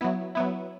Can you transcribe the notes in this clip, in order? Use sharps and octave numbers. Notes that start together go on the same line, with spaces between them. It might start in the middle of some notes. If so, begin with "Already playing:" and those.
F#3 B3 E4
F#3 B3 E4